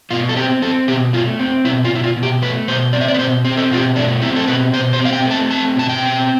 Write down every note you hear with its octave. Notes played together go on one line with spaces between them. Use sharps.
B2 F4
A4
C4 G4
C4 A4
B2 G4
A3 F4
C4
B2 E4
F4
B2 E4
F4
B2
G4
A3 B4
B2 C5
C4 D5
E5
D5
B4
B2 C5
C4
A4
B2 F4
G4
A3 D4
C4 E4
A4
B2 B4
B2 C5
C5
C4
F5
G5
A3
A5
C4 A5
B2 A5
G5
C4